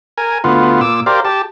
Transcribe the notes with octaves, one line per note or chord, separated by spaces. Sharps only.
A#4 G#5
D2 B3 F4
A#2 D6 E6
G4 A#4 C5 D5 F5
G4 A5